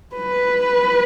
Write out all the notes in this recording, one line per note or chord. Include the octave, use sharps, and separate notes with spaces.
B4